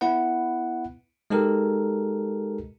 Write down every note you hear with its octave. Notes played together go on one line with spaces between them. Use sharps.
B3 E4 B4 F#5
G#3 D#4 G4 A4 A#4